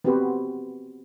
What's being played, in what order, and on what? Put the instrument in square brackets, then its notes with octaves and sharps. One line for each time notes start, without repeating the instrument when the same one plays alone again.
[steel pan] B3 C4 F#4 G4 B4 C5